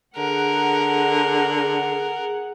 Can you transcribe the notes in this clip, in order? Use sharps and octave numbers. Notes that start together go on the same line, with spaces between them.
D3 G#4 A#4 F#5